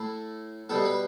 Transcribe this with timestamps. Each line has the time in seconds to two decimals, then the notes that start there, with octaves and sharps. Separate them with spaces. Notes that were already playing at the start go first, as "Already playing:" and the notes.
Already playing: A2 A3 E4
0.69 B2 G3 B3 A4
0.85 B4